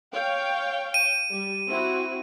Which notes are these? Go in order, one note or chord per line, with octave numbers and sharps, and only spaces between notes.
C#5 F5 G5
D#7
G3
C4 E4 F#4